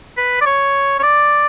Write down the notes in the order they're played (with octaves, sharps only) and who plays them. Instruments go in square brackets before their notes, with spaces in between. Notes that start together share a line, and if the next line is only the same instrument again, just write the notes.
[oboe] B4
D5
C#5
C#5
D5